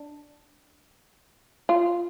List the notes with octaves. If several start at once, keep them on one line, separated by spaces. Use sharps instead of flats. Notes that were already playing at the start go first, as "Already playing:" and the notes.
Already playing: D4
F4